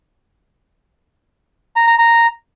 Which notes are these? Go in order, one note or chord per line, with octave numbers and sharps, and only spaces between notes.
A#5
A#5
A#5